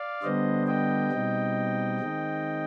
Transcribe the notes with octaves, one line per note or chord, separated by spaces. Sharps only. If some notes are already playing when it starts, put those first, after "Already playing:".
Already playing: D5 F5
D3 G3 B3 D4 C5 D#5
D#5 G5
B2 G3 C4 D#4
D#3 G#3 C4 D#4